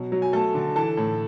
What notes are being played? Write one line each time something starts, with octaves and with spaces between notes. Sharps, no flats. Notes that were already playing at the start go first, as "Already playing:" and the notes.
Already playing: B2 F#3
F#3
G#5
A3 A4 A5
D3
E3 A4 A5
A2